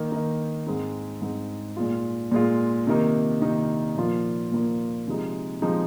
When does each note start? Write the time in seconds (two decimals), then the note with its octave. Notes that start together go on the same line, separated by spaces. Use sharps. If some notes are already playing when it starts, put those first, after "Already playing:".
Already playing: D#3 A#3 D#4
0.12 D#3 A#3 D#4
0.67 G#2 G#3 C4 D#4
1.22 G#2 G#3 C4 D#4
1.77 A#2 G#3 F4
2.31 A#2 G#3 F4
2.87 C3 D#3 A#3 D#4
3.41 C3 D#3 A#3 D#4
3.97 A#2 F3 A#3 F4
4.52 A#2 F3 A#3 F4
5.07 C3 F3 G#3 D#4
5.62 C3 F3 G#3 D#4